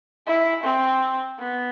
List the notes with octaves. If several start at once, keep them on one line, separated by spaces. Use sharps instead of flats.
E4
C4
B3